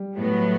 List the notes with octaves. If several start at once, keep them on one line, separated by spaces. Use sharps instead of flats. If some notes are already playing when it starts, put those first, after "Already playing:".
Already playing: G3
A2 F#3 B3